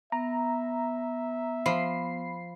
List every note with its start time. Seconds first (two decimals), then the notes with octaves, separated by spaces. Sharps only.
0.12 B3 E5 A#5
1.66 F3 B5 C7